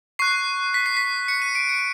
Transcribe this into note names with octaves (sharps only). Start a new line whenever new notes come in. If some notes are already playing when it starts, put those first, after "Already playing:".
C#6 F#6 C7
B6
C7
B6
C#7
D#7
D7
C#7